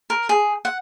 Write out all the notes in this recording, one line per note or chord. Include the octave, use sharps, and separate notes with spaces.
A#4
G#4
F#5